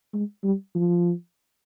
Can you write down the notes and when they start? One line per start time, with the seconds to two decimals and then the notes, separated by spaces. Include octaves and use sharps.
0.14 G#3
0.44 G3
0.75 F3